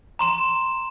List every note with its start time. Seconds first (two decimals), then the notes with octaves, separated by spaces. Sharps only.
0.19 A#5 C6 E7